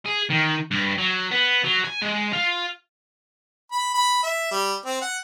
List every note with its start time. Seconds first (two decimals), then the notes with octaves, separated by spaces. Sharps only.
0.06 G#4
0.30 D#3
0.71 G2
0.98 F#3
1.31 B3
1.64 F#3
1.84 G#5
2.02 G#3
2.33 F4
3.72 B5
3.94 B5
4.23 E5
4.51 G3
4.85 C4
5.01 F#5